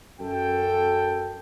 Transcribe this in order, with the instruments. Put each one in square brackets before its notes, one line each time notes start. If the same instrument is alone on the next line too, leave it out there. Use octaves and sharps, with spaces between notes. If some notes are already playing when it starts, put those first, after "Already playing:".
[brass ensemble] F#2 A4 G5